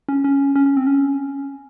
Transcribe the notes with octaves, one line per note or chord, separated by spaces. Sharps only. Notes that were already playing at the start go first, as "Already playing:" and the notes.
C#4
C#4
C#4
C#4
C4
C#4